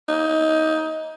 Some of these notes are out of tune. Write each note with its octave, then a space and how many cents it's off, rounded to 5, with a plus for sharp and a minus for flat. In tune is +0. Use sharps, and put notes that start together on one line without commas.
D#4 +20